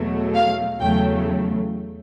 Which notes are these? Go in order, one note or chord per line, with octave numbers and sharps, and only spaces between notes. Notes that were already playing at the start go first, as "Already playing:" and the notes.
Already playing: E2 B2 F#3 A3
F5
E2 C#3 F#3 A3 G5